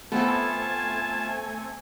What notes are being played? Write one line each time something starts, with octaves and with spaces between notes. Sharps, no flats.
A3 B3 C4 F4 A4 G#5 A5